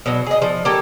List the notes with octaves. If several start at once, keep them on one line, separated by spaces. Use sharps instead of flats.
B2 F#3
G#4 D#5
F3
A#3 C#4 G4 A4